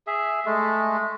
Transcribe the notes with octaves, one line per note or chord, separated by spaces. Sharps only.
G#4 E5
G#3 A3